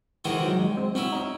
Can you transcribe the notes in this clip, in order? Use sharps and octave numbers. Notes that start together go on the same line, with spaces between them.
C3 D#3 E3 G#3 D#4 F#4
F#3
G#3
C4
F#3 C4 C#4 E4
D#4